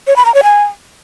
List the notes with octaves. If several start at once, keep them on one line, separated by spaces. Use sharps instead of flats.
C#5
B5
A#5
C#5
G#5